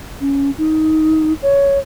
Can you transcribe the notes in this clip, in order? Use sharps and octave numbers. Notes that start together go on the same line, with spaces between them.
C#4
D#4
C#5